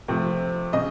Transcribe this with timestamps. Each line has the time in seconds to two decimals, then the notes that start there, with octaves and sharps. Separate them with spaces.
0.08 C3 F3 A3 C4
0.73 C#3 D#5